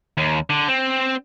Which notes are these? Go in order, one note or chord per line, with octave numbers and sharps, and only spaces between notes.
D#2
D3
C4